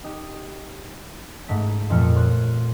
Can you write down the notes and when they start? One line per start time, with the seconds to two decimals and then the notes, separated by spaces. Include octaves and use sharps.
0.04 D#4 G4
1.48 G#2 A3 B6
1.89 F2 A#2 F3 A3 F6 C#7
2.16 C#5 C6 F#6